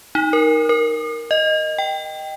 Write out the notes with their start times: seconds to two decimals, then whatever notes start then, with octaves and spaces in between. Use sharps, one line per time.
0.15 D#4
0.33 A#4
0.69 A#4
1.31 D#5
1.78 G5